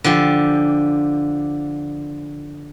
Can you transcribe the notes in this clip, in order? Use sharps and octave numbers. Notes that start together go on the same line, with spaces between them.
D3 F3 G4